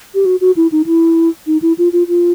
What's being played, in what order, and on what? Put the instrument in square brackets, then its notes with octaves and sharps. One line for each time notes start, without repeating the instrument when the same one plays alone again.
[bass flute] G4
F#4
F#4
E4
D#4
E4
D#4
E4
F4
F4
F4